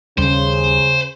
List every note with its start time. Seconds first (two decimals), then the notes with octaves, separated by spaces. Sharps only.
0.18 D#2 C#3 G3 C5